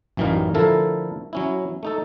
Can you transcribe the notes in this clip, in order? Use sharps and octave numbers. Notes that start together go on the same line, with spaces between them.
A1 F#2 E3 G3 D#4 F5
D3 F3 A3 E4 A4 A#4
F#3 C#4 E4
A3 D#4 A4